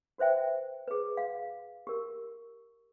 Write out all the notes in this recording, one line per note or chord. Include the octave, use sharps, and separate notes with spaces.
F#4 B4 C5 E5 G5
G#4 B4
F5
G4 A#4